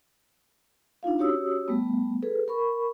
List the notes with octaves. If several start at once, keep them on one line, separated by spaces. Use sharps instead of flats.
D4 D#4 F4 F5
C#4 F#4 G4 C#5 D#6 E6
G3 A3 B3
G#4 A4 B4
A#4 B5 C#6